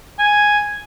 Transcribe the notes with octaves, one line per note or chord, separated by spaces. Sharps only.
G#5